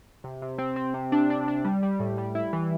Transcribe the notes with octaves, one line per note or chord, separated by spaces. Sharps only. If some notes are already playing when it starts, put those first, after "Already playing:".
C3
C3
C4
C4
C3
D4
D4
D4
G3
G3
A2
G3
E4
E3